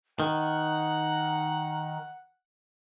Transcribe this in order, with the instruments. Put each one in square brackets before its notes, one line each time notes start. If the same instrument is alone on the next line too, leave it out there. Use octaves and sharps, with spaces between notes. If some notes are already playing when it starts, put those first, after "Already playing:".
[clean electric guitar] D#3 [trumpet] F#5 [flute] A#5